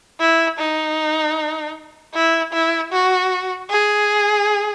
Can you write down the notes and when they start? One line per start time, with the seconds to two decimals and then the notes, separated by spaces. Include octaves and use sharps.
0.20 E4
0.59 D#4
2.14 E4
2.53 E4
2.92 F#4
3.70 G#4